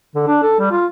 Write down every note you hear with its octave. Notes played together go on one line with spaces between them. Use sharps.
D3
D4
A4
G3
F4